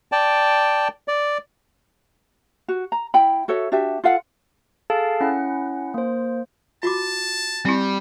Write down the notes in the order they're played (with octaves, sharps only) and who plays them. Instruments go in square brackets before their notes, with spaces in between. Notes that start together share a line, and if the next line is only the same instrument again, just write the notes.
[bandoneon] D5 G5 A5
D5
[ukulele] F#4
A#5
E4 G5 B5
F#4 A4 C#5 E5
D4 F#4 G4 E5
F4 A4 F5 F#5
[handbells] G#4 A4 F5 A5
C#4 E4 F#5
A#3 C5
[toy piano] F4 F#4 D6 [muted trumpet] A5
[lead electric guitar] G3 [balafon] C4 E4